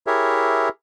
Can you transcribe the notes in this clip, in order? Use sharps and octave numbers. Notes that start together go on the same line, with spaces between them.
E4 G4 G#4 A#4 C#5 E5